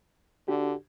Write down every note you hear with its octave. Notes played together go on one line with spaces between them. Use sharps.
D3 D4 F#4 G4